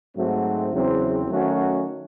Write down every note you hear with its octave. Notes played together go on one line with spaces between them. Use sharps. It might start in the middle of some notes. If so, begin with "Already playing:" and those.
G#2 F#3 A3 C4 F#4
E2 C#3 F#3 C4
D#3 F#3 A3 C#4 F#4